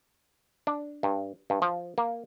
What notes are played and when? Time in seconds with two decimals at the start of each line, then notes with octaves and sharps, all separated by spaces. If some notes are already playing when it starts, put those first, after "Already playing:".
0.67 D4
1.03 G2
1.50 G2
1.62 F3
1.98 A#3